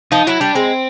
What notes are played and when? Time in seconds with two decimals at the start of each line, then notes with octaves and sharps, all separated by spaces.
0.12 F3 D#4
0.27 F#3 E4
0.40 G3 D4
0.55 G#3 C4